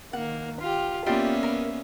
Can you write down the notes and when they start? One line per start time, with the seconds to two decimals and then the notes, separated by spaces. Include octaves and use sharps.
0.13 D#3 A#3 F#5
0.61 F4 G4
1.06 A#3 B3 C#4 F4 G4 D5 E5
1.43 A#4